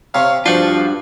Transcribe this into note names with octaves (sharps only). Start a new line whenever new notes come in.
C3 C#5 F5
G2 F3 D4 F4 F#4